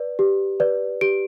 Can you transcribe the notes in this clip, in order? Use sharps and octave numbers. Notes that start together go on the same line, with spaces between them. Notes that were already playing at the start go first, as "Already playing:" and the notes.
Already playing: B4 D5
G4
B4 D5
G4 D7